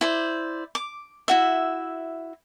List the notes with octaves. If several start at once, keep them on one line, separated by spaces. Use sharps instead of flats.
E4 C5 D5
D6
E4 F#4 E5